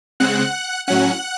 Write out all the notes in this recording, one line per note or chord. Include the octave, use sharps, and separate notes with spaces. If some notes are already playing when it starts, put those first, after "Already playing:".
C#3 G#3 C4 F#5 F#6
A2 F#3 C#4 F#5 F#6